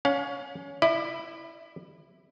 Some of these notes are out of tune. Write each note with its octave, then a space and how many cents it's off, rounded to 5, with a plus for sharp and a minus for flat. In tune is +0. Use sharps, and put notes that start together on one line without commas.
C#4 +15 F5 +40
E4 +0 D5 +40